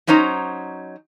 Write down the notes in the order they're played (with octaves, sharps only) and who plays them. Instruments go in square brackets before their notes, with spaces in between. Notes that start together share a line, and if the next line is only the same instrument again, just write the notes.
[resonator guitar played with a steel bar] F#3 C#4 D#4 C5 A#5